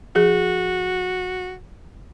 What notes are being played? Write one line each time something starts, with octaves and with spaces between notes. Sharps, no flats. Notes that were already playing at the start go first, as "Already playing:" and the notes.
F3 F#4 G#4